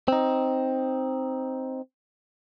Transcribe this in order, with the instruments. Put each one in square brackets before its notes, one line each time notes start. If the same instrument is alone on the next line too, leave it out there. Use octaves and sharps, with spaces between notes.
[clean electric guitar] C4 D#4